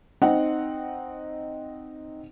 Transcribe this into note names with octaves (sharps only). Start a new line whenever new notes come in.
C4 D#4 F#5